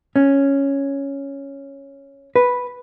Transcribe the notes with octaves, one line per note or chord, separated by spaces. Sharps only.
C#4
B4